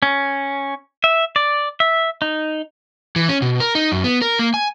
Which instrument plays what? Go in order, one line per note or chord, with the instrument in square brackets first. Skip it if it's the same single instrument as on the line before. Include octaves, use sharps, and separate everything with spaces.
[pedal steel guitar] C#4
E5
D5
E5
D#4
[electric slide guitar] E3
C#4
B2
A#4
D#4
F#2
B3
A#4
A#3
G#5